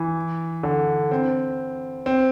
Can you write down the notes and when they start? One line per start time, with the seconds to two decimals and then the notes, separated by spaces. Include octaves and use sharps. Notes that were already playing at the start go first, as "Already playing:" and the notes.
Already playing: E3
0.63 D3
1.11 C4
2.06 C4